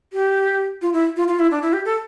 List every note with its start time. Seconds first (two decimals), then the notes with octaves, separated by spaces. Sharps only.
0.13 G4
0.82 F4
0.93 E4
1.17 F4
1.28 F4
1.39 E4
1.51 D4
1.62 E4
1.73 G4
1.85 A4